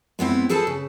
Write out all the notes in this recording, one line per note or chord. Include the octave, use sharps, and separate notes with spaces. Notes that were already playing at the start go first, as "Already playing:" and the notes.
G#3 B3 C4 E4
G#4 A4 B4 C5 A5
C#3